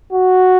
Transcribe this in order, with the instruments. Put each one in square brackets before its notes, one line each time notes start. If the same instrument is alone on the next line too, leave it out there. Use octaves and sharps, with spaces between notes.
[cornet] F#4